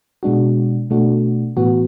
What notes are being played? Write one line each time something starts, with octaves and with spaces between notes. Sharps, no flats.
B2 G#3 D4 F#4
B2 A3 D4 F#4
A2 E3 B3 F#4